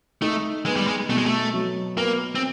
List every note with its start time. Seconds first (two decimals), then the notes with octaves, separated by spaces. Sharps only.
0.22 A3 D#4
0.66 G#3 B3
0.76 G3
0.87 G#3
1.09 B2 A3
1.18 G#3
1.26 A3
1.54 F#3
1.97 A#3 B3
2.35 C4